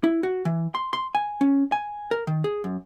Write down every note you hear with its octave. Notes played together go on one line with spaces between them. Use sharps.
E4
F#4
E3
C6
C6
G#5
C#4
G#5
A#4
D#3
G#4
F#2